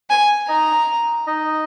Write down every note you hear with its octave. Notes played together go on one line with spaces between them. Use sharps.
G#5
D#4 D#5 A#5
D#4 D#5